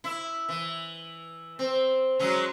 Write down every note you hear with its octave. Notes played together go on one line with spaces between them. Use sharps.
E4
E3
C4
F#3 G#3 C#4